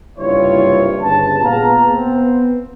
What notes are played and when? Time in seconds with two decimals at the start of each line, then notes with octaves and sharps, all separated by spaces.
0.19 F#1 C2 G2 E4 F4 C#5
1.02 G1 C#3 B4 A5
1.43 A#2 B3 G#4 F5 A#5
1.90 B3 C4